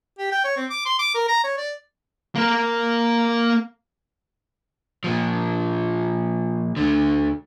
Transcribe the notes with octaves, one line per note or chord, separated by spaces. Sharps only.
G4
G5
C#5
C4
D6
C6
D6
A#4
A#5
C#5
D5
A#3 A#4
A#2 F3
D2 D3